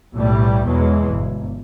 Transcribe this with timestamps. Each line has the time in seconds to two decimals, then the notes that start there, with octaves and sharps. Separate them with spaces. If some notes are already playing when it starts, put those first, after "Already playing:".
0.14 B1 A2 E3 G3 A3
0.65 E2 B2 E3 F#3 G#3
1.09 G1